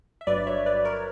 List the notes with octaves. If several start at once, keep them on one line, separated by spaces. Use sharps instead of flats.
E5
G1 G2 F#3 B4 D5
C#5 E5
B4 D5
A#4 C#5